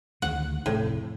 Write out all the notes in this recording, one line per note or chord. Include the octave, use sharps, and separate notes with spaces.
D2 D#3 E3 F#5
F1 A2